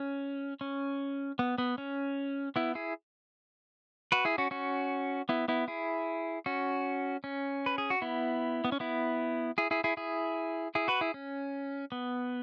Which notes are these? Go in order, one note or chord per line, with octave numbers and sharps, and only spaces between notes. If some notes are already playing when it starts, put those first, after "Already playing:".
Already playing: C#4
C#4
B3
B3
C#4
B3 E4
E4 G#4
F#4 B4
E4 G#4
C#4 F#4
C#4 F#4
B3 E4
B3 E4
E4 G#4
C#4 F#4
C#4
B4
G#4
F#4
B3 E4
B3
C#4
B3 E4
E4 G#4
E4 G#4
E4 G#4
E4 G#4
E4 G#4
F#4 B4
E4 G#4
C#4
B3